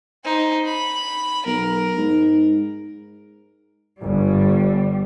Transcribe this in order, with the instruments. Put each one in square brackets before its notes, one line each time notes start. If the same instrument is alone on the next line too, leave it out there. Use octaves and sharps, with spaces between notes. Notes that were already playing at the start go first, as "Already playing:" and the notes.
[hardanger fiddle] D#4 C5
B5
[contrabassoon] B1 [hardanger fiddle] A#4
[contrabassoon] G#2
[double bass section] G1 [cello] G3